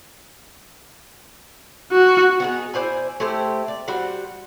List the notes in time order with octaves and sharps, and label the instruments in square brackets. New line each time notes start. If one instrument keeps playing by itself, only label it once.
[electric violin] F#4
[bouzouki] B3 D#4 G#4
E4 C5 D5 G#5
A3 E4 G4 C5
D5
G3 F#4 C5